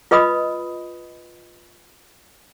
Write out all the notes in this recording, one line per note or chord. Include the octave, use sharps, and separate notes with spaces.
F4 B4 D#5 B5 D#6